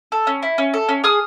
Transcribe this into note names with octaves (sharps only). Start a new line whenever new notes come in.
A4
C#4
E4
C#4
A4
C#4
G#4 D#6 F6